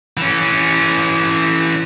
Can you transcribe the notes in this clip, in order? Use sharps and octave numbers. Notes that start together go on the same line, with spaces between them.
E3 C#4